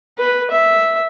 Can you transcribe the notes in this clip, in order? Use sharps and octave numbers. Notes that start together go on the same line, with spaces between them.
B4
E5